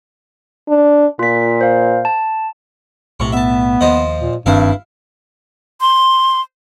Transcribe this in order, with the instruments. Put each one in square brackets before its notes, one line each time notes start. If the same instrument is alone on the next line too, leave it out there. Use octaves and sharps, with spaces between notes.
[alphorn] D4
[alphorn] A#2 [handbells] F4 B6
[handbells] C5 F5
A5
[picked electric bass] B1 A2 [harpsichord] C3 C#6
[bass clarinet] B3 [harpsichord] E5 A5
[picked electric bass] D#2 [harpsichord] F3 C5 D#5
[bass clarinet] A#2
[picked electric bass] F#1 D#3 C4 [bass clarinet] G2 [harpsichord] E4 E5 F5
[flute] C6